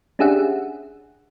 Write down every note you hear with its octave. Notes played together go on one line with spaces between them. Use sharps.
C#4 D4 G4 G#4 E5 F#5